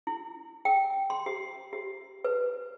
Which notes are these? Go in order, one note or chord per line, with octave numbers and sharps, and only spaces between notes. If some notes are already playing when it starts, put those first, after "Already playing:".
E4
G5
C6
G4
G4
B4